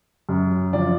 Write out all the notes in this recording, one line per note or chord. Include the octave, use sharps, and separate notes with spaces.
F#2
F3 D5